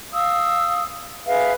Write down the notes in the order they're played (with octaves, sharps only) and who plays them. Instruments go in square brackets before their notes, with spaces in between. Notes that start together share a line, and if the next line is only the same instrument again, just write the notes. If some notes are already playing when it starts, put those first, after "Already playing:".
[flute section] F5 D#6 E6
G#4 B4 E5 F5